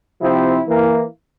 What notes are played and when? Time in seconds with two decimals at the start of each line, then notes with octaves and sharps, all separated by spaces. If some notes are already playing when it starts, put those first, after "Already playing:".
0.19 C3 F3 C4 E4
0.67 E3 A#3